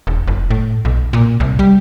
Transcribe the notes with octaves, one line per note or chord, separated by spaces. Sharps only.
E1
F#1
A2
B1
A#2
C2
G3